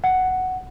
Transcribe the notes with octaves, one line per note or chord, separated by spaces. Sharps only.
F#5